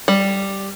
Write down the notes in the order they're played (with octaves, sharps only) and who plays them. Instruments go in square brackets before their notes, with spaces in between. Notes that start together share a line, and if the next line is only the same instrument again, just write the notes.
[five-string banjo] G3